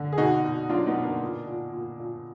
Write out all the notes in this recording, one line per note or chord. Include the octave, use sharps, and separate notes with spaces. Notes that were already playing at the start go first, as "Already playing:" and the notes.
Already playing: D3
G#4
B2 D#4 F#4
B2
F#3 D4 F4
B3 D#4
B2
A#3 D4
A#2
A#2
A#2
A#2